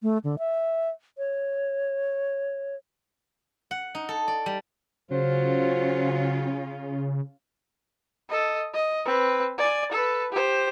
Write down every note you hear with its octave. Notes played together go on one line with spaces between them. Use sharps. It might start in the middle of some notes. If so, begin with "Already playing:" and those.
A3
D3
E5
C#5
F#5
D#4
A4
D5
G3
C#3 F#3 C#4 F4 C5
A4 D#5
D#5
C4 B4
D5 G#5
A4 B4
G4 C5